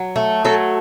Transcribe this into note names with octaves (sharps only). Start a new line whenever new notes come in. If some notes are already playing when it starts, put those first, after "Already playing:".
Already playing: F#3
A3
F#3 A4